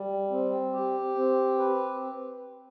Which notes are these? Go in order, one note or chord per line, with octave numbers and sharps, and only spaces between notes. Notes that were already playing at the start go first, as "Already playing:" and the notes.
Already playing: G3
C4
G4
C4
B4